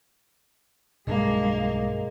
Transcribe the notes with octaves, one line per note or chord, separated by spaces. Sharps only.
B1 G2 G#3 A#3 D4 G#4 A#4 D#5